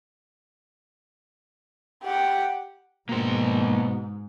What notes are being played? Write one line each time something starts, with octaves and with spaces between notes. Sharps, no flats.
G4 F#5
G#2 B2 A#3 C5